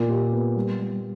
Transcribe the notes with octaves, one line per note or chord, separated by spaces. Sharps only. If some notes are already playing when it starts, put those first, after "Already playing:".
Already playing: A#2
G4
B3
G3
G3